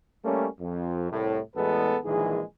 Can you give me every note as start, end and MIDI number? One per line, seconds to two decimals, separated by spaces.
0.25 0.47 55
0.25 0.47 57
0.25 0.47 58
0.25 0.47 61
0.61 1.10 41
1.11 1.39 36
1.11 1.39 45
1.56 1.97 33
1.56 1.97 40
1.56 1.97 56
1.56 1.97 59
1.56 1.97 69
1.56 1.97 71
2.05 2.43 34
2.05 2.43 51
2.05 2.43 52
2.05 2.43 56
2.05 2.43 68